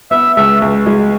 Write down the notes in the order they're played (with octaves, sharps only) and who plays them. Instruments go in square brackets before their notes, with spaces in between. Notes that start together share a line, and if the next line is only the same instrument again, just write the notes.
[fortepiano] B3 [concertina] E5
[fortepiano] C#2 [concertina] E5
[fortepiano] C#2
G#3